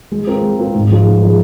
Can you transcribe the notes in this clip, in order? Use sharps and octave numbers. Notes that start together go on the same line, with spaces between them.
G#3
C4 F4 A#4
G#3
C4 F4 A#4
G#2
F3 G#3 F4 G#4
G#2
F3 G#3 F4 G#4